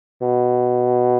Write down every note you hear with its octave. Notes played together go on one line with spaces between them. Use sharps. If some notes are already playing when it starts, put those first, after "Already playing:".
B2